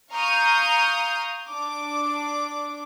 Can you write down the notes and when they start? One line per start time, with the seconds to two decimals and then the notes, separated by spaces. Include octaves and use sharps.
0.12 F5 A#5 C#6 D#6 F6 G6
1.49 D4 D6